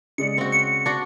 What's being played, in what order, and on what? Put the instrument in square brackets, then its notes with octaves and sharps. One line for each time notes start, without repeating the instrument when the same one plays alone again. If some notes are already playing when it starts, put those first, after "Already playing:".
[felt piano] C#3 G#3 D5 [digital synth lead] C#7
[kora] C4 F#4
[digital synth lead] C#7
[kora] D4 F#4